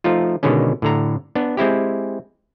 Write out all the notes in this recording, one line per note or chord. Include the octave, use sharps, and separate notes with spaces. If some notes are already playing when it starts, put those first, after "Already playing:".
F3 A3 D#4 F4
B2 D3 D#3 G#3 C#4
A2 D3 A#5
B3 D4
G#3 C4 E4 G4